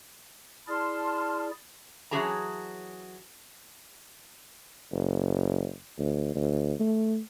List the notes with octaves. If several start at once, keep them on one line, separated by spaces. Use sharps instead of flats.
E4 G#4 D5 A5 C6 F6
E3 F#3 C#4 G#4 A5 A#5
F#1
D2
D2
A3